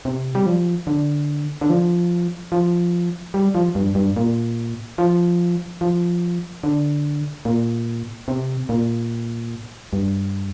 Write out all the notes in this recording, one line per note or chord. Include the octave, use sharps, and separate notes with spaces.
C3
G3
F3
D3
D3
F3
F3
G3
F3
G2
G2
A#2
F3
F3
D3
A#2
C3
A#2
G2